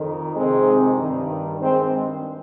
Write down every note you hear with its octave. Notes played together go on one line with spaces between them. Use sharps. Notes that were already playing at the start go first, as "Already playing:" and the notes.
Already playing: F2 D#3
F2 C3 D#3 G#3 C4
G2 D#3
G2 D#3 G#3 C4